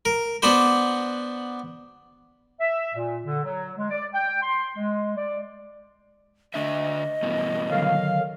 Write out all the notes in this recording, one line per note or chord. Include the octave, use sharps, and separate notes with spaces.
A#4
B3 D4 F#4 B4 C5
E5
A#2
D3
F#3
G#3
D5
G5
C6
G#3
D5
D3 D4 D#5 E5
G2 B2 E3
D3 D#3 F#3 F5